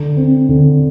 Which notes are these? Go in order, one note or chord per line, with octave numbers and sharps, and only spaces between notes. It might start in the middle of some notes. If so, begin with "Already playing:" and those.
Already playing: D3
C4
D3